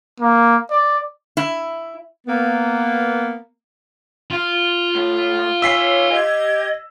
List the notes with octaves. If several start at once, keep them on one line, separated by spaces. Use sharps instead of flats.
A#3
D5
E4
A#3 B3
F4
A2
C#5 E5 G#5 E6 B6 C7
G4 D#5 G#6